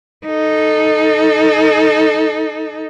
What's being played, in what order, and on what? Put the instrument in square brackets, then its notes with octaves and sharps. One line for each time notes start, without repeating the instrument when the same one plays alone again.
[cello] D#4 A4